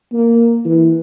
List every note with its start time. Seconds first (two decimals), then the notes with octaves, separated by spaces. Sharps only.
0.13 A#3
0.65 E3